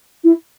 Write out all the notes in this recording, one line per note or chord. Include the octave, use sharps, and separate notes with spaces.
E4